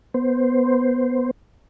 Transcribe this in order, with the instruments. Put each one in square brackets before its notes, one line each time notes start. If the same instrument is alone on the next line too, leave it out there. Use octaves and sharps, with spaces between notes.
[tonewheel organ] B3 C5